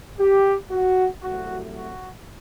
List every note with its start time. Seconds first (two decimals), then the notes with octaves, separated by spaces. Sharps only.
0.19 G4
0.71 F#4
1.22 C2 C3 F#3 A3 F#4
1.75 F#4